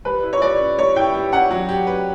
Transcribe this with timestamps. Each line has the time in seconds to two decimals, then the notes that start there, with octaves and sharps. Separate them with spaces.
0.05 G3 B4
0.23 E4
0.33 C#5
0.42 G3 D5
0.60 C#4
0.79 G3 C#5
0.96 E4 G5
1.14 G3
1.32 C#4 F#5
1.51 F#3
1.69 G4
1.87 B4